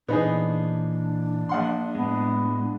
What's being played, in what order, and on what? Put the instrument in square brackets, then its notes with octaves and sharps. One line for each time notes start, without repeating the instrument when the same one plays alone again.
[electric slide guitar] A#2 E3 C5 [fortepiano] B3 D#4 G#4 [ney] D4
[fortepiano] A#1 F#5 C6
[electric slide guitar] A2 G#3 [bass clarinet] B3